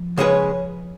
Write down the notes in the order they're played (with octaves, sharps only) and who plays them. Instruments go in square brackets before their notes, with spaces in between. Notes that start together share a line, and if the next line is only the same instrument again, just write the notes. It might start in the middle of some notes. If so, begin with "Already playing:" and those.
Already playing: [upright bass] F3
[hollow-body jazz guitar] C#3 G#3 C#4 G#4 B4